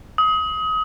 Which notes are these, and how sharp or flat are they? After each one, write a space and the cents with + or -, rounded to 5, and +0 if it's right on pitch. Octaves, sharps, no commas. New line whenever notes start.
D#6 +30